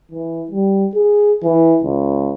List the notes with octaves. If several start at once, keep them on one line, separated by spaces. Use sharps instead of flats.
E3
G3
G#4
E3
C#2